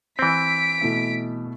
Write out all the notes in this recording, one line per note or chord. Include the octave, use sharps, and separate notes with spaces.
E3 C4 B6 D7
B2 A3 E4